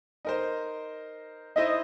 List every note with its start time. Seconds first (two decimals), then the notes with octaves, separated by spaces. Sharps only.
0.25 D#4 A#4 C5
1.56 D#4 E4 C5 D#5